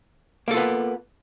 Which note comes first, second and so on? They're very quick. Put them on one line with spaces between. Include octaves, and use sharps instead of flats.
A#3 A4 F4 B3